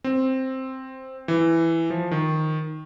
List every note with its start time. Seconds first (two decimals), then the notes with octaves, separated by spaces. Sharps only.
0.04 C4
1.28 E3
1.90 F3
2.11 D#3